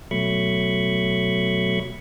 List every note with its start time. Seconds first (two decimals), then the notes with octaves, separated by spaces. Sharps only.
0.11 B2 F#3 A3 B5 C#6